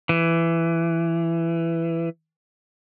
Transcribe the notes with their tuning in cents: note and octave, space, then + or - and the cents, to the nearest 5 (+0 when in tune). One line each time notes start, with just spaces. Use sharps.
E3 +15